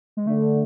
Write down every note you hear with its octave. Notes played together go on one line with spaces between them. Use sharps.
G#3
D3 A3